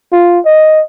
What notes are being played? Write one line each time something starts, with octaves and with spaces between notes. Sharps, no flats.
F4
D#5